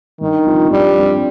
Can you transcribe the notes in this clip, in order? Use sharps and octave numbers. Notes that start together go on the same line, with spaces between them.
G2 D#3
F3 C4 F4
G2 G3
F3 C4 F4